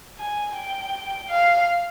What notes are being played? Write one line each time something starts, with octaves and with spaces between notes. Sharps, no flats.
G#5
G5
F5